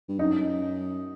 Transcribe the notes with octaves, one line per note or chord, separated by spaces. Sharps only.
G2
F#2 D#4